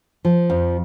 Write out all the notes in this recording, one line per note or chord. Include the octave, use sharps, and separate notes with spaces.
F3
F2